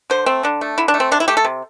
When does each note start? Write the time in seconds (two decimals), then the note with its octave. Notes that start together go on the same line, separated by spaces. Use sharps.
0.10 D3 C5
0.26 A3 C4
0.43 D3 D4
0.61 A3
0.78 D3 E4
0.88 D4
0.94 A3
1.00 C4
1.11 C3 D4
1.20 E4
1.28 A3 G4
1.37 A4
1.45 C3